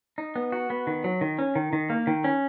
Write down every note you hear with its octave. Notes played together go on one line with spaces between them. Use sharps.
D#4
B3
F#4
B3
D#3
F#3
D#3
C#4
D#3
D#3
A#3
D#3
C#4